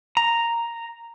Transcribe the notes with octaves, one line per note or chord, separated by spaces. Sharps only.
A#5